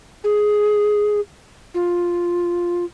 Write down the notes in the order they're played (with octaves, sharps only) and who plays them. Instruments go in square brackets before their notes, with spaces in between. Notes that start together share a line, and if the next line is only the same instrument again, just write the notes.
[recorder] G#4
F4